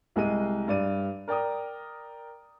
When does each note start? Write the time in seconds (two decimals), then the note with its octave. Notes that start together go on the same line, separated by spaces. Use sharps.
0.16 C2 G#3 D#5 D#7
0.68 G2 D5 D#7
1.28 A#4 D5 G5 A#5 D#6